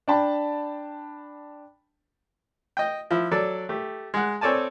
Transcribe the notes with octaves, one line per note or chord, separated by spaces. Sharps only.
D4 G5 A5 B5
D#5 G5
F3 E4
F#3 A4 D5
A3 G4
G#3 F#5
C4 A4 C#5 D5 G#5 A5